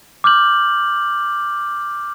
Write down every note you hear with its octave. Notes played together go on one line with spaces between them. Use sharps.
D6 F6 G6 F#7